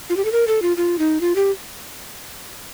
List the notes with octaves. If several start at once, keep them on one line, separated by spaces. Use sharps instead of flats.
F4
G4
A4
A#4
A4
F4
F4
D#4
F4
G4